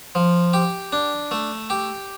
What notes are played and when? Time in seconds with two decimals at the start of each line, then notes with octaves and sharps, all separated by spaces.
0.15 F3
0.53 G4
0.93 D4
1.31 A3
1.70 G4